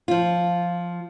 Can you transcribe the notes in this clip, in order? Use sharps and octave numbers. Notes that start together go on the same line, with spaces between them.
F3 F4